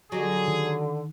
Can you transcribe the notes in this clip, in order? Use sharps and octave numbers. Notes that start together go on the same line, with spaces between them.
D3 F#3 G4 G#4
D#3